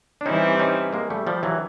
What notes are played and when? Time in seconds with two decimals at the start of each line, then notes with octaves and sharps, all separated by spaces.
0.21 D4
0.25 E3 G3 C4 C#4 D#4 E4
0.59 C#4 D#4
0.93 G#3 A#3
1.10 G3 A3
1.27 F3 G3
1.43 E3 F#3